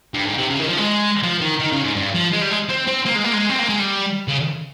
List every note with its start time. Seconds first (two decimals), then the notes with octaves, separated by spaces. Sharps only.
0.14 G2
0.26 G#2
0.38 C3
0.50 C#3
0.60 D#3
0.68 F3
0.78 G#3
1.23 F3
1.41 D#3
1.60 D#3
1.72 C#3
1.84 G#2
1.96 G2
2.15 F3
2.33 G#3
2.42 G3
2.51 G#3
2.69 C4
2.88 C4
3.06 A#3
3.16 G#3
3.24 A#3
3.34 G#3
3.50 C4
3.59 A#3
3.69 G#3
3.79 G3
4.28 C#3